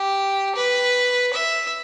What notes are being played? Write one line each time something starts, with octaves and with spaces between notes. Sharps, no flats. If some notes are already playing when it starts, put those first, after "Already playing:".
Already playing: G4
B4
E5